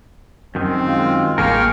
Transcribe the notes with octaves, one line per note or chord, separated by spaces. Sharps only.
F#2 D#3 C4
G#3 F4
A1 A#3 G#4 A#4 F5 G5 C#6 F6